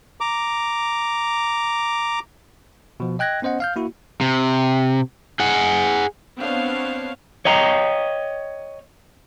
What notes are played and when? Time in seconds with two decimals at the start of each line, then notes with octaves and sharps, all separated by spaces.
0.21 A#5 D6
3.00 B2 F3
3.19 D#5 G5 F#6 G#6 A#6
3.42 B3 C#4 C5 D#5 F#5
3.60 F5 F6 G6
3.76 A#3 E4 F#4
4.21 C3
5.40 G#4 F#5
6.38 B3 C4 D4 C#5 F5
7.45 C#5 D#5 G5 A#5